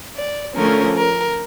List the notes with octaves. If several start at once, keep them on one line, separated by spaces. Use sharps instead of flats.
D5
D3 F3 A3 C#4 A#4
A#4